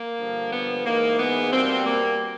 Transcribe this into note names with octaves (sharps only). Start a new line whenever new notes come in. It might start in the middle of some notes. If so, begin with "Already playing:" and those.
Already playing: A#3
G2 D3 F3
B3
G#2 E3 G#3 A#3
B3
B2 G3 A#3 C4
A#3